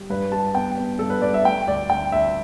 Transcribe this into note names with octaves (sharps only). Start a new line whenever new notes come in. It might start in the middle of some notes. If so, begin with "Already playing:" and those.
Already playing: G3
G2 B4
G3 A5
B3 G5
B3
G2 A4
B4
G2 D5
E5
A3 G5
D2 D5
D2 G5
D2 E5